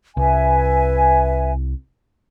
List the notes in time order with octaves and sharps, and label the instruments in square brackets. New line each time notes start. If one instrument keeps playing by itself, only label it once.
[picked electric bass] C2 [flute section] B4 E5 G#5